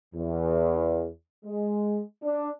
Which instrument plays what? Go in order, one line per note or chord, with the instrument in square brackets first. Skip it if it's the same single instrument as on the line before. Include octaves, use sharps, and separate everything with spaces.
[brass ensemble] E2
G#3
D4